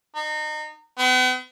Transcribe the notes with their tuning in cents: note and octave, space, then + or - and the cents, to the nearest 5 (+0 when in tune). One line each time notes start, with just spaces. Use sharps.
D#4 -30
B3 +45